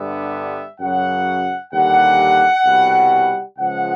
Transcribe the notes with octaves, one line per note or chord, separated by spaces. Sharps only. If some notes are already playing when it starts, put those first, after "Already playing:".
Already playing: G2 D3 G3 B3 E5
F#2 C#3 F#3 F#5
D#2 D3 G3 F#5
C2 B2 G3
C#2 C#3 F3 G#3 F#5